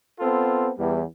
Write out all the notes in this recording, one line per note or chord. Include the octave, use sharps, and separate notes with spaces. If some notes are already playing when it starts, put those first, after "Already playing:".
B3 C4 F4 A4
E2 G3